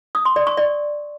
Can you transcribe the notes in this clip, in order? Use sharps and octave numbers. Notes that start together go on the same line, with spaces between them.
D#6
C6
D5
C#6
D5